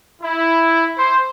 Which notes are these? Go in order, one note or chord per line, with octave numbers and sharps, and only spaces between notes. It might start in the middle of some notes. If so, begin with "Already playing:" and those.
E4
C5